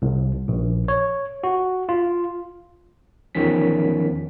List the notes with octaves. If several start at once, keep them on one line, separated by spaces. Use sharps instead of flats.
C2
A#1
C#5
F#4
F4
E2 D#3 F3 C#4 B6